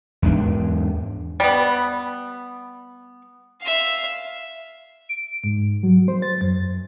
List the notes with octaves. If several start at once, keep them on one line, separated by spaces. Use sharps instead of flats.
E2 G#2 D4
G3 B3
E5 F5
D7
G#2
F#3
C5
A6
F#2